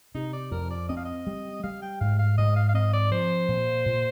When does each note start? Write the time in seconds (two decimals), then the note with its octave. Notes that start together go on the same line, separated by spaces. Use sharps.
0.15 C3 D#4
0.33 D5
0.51 F2 A#4
0.70 D5
0.89 C4 D#5
0.97 F5
1.05 D#5
1.27 G3
1.63 G3 F5
1.82 G5
2.00 G#2 F5
2.19 F5
2.38 G#2 D#5
2.56 F5
2.69 F5
2.74 C4 D#5
2.93 D5
3.11 F3 C5
3.48 A#2
3.86 A#2